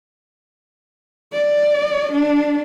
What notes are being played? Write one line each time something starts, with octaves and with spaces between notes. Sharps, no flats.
D5
D4